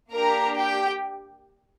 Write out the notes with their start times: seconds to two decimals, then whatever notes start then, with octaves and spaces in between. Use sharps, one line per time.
0.11 A#3 D4 G4 A#4 A#5
0.56 G4 G5